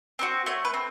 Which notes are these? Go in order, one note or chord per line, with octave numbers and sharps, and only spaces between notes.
C4 D#4 F#4
A3 C#5
B4
C4